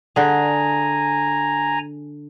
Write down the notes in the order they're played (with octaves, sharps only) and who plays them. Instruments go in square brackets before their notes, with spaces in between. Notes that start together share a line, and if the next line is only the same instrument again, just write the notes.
[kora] D3 G#4 [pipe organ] G#5 A#5